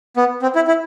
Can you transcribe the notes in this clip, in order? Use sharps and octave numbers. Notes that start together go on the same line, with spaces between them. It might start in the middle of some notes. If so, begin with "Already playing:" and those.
B3
C4
E4
E4